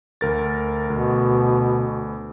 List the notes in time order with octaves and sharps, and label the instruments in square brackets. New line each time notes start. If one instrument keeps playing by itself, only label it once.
[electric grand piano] D2 A#4 A6
[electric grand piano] D2 [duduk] B2